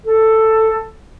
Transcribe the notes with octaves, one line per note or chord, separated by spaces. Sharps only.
A4